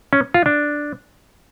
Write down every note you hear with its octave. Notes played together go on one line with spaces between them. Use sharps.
C#4
F4
D4